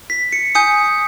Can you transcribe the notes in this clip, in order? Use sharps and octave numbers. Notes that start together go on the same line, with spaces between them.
B6
C#7
G#5 D#6 G6 C#7